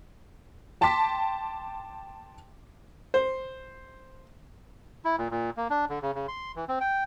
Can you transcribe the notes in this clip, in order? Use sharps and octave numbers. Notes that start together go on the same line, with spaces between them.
G5 A5 C6 D6 B6
C5
E4
A#2
A#2
A#3
D4
D3
C#3
C#3
C6
E3
C4
G5